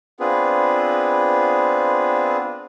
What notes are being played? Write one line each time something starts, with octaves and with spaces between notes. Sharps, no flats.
B3 C4 D4 F4 G#4 B4